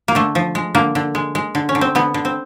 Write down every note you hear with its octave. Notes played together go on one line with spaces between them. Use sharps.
A#3
D3 A3
F3
G#3
D3 A#3
D3
G#3
G#3
D3
C#4
D3
C4
D3 B3
D3
C4